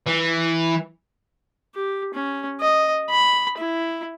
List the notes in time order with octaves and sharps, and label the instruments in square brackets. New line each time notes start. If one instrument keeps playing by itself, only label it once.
[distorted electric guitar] E3
[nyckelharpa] G4
C#4
D#5
B5
E4